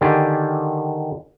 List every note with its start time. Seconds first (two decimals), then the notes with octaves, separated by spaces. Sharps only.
0.01 D3 D#3 G4 G#4 D5